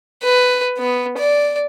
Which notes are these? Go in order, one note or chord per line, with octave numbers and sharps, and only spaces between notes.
B4
B3
D5